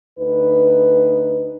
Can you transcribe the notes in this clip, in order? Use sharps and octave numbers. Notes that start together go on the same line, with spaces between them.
D2 D#4 B4